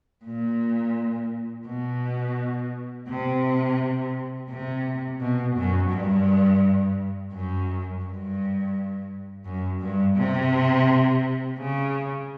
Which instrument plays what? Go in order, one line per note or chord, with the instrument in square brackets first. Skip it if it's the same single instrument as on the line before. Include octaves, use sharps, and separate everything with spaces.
[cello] A#2
B2
C3
C3
B2
F#2
G2
F#2
G2
F#2
G2
C3
C#3